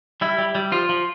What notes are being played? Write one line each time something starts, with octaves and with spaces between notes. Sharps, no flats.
G3 E4
G3
G3
F3 F4
F3